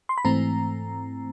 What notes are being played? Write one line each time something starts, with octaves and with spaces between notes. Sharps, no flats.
C6
B5
G#2 E3 A3 C4 A#5